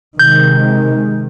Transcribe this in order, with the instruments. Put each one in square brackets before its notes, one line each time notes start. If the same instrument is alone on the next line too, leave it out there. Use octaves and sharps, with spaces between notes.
[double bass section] C3 D#3 G#3 [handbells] G6